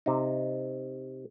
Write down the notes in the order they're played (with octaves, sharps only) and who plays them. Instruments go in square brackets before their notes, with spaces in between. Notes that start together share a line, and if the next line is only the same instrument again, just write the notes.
[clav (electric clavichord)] C3 D#4